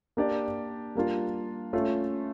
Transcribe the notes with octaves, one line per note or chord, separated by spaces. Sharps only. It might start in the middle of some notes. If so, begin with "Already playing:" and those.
A#3 D4 G4 A#4 D5
G3 A#3 D4 F4
A3 C#4 F4